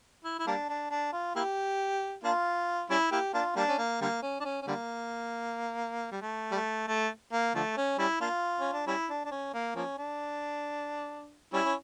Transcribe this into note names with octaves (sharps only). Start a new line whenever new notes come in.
E4
E4
G3 A#3 D4
D4
D4
F4
A#3 E4 G4
A#3 D4 F4
G3 C#4 E4
A#3 E4 G4
A#3 D4 F4
G3 A#3 D4
C#4
A#3
D3 G3 A#3
C#4
D4
C#4
C#4
D3 G3 A#3
G3
A3
G3
A3
A3
A#3
D3 F3 A3
C#4
G3 C#4 E4
A#3 D4 F4
C#4
D4
G3 C#4 E4
D4
D4
C#4
A#3
F3 A#3 C#4
D4
G3 C#4 E4
C#4